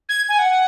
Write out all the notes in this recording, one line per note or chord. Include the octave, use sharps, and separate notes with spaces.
G#6
G#5
F#5